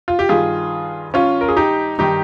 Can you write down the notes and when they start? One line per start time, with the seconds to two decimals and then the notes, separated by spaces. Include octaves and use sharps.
0.08 F4
0.19 G4
0.29 G2 D#3 F4 G#4
1.14 C#4 F4
1.41 A#4
1.48 G#4
1.56 D#4 G4
1.99 G2 D#3 D#4 G4